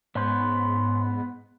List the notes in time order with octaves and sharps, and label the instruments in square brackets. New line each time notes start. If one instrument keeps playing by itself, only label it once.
[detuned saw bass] G#2 [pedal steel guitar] B3 [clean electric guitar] C#4 C5